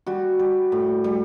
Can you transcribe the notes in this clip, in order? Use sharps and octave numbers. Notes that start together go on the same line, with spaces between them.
G3 F#4
G3
A2
G3